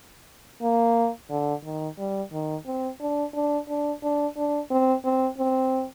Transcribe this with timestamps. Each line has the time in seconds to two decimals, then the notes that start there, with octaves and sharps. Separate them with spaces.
0.62 A#3
1.30 D3
1.64 D#3
1.98 G3
2.32 D#3
2.66 C4
3.00 D4
3.34 D4
3.68 D4
4.03 D4
4.36 D4
4.70 C4
5.05 C4
5.38 C4